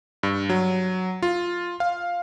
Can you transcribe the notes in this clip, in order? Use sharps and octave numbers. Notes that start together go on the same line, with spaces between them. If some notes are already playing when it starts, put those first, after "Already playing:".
G2
F#3
F4
F5